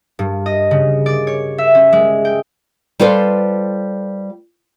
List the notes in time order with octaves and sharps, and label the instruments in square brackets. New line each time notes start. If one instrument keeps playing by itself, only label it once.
[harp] G2
D#5
C#3
D5
C#5
E5
C#4
G#3
G5
[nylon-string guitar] G3 F4 A4 B4 C5